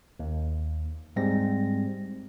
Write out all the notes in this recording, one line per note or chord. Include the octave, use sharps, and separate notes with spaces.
D#2
G#2 G3 G#3 C4 A#6